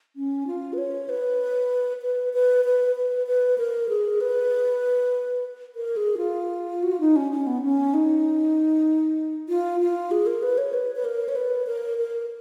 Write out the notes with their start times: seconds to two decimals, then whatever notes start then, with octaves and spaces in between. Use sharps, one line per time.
0.16 C#4
0.47 F4
0.73 B4
0.78 C#5
1.09 B4
2.02 B4
2.33 B4
2.65 B4
2.96 B4
3.27 B4
3.58 A#4
3.89 G#4
4.21 B4
5.76 A#4
5.97 G#4
6.18 F4
6.83 F#4
6.92 F4
7.00 D#4
7.16 C#4
7.32 C#4
7.47 B3
7.63 C#4
7.94 D#4
9.49 F4
9.80 F4
10.11 G#4
10.26 A#4
10.43 B4
10.58 C#5
10.73 B4
10.96 B4
11.05 A#4
11.29 C#5
11.36 B4
11.67 A#4
11.98 A#4